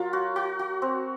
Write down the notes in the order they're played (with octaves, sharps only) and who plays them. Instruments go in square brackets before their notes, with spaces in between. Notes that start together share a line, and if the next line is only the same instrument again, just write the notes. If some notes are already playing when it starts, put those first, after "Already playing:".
Already playing: [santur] F#3 F4 A#4
F#4
F#4
F#4
C4